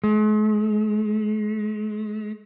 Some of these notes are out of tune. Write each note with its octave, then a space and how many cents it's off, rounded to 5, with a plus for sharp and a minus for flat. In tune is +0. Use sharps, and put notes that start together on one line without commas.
G#3 +45